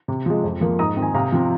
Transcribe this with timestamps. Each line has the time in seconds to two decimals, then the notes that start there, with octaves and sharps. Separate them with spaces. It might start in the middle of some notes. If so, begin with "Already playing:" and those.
0.08 C3
0.26 F3 G#3
0.44 F2
0.61 F3 A#3
0.79 G#2 A#5 D#6
0.97 D#3 C4
1.02 G#5
1.14 C3 F5 A#5
1.32 F3 C4